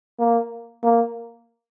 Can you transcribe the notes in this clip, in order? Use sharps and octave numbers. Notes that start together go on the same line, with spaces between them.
A#3
A#3